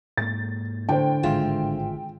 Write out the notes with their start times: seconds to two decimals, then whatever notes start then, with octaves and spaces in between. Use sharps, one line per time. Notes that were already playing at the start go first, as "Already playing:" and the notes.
0.17 G#2 A#3 A6
0.89 A2 D3 C5 G5
1.23 G#1 A2 G#3 F4 E5